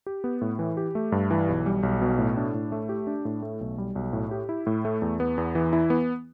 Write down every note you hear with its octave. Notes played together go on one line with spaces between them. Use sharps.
G4
B3
A2
E3
G4
A3
G2
E3
B1
G3
B1
B2
A2
D4
A2
A3
G4
D4
A2
A3
B1
G3
B1
A2
G4
E4
A2
A3
E2
B3
E2
E3
E4
B3